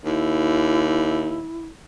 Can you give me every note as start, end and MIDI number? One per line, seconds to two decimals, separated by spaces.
0.05 1.45 39
0.05 1.66 64